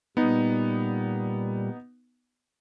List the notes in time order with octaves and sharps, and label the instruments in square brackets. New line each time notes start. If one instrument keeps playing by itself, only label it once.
[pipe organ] A#2 G3 [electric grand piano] B3 D#4